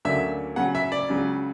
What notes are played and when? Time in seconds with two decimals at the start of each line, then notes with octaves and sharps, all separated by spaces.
0.05 D2 D3 F#3 A#3 C#4 E5
0.56 C#3 F#3 C#4 F#5
0.75 E5
0.92 D5
1.09 C#2 C#3 F#3 C#4